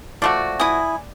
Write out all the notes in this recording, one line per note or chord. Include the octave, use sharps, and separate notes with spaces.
F3 A3 F#4 D5
E4 G#5 D#6